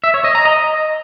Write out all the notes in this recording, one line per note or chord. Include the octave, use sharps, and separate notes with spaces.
E5
C#5
D#5
A#5
D#5